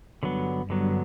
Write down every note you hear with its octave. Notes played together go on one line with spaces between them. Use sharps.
G2 D3 F#3 B3
G2 D3 F#3 B3